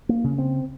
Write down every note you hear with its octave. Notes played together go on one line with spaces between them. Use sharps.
A#3
C#3
C4